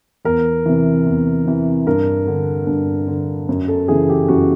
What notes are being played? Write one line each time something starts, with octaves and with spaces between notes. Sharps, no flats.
E2 A#4
C3 E3
E2
C3 E3
G2 A#4
D3
G2
D3
F#2
A4
C#3 E3 G#4
G4
F#2 F#4